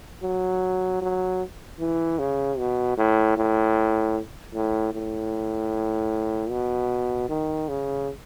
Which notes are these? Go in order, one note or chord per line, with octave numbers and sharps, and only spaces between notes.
F#3
F#3
E3
C#3
B2
A2
A2
A2
A2
B2
D#3
C#3